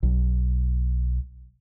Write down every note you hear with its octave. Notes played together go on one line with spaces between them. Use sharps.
B1 F#3